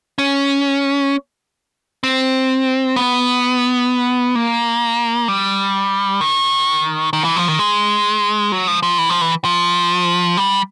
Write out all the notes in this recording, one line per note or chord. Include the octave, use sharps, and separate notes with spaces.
C#4
C4
B3
A#3
G3
D#3
D#3
E3
F3
D#3
G#3
F#3
F3
F3
E3
F3
E3
F3
G3